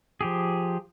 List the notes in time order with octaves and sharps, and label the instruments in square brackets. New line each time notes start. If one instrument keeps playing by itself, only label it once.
[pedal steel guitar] F3 G4 G#4